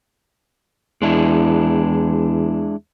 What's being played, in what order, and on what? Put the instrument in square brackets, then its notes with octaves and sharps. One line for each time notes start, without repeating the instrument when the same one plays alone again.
[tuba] E2 [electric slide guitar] G#3 D4 E4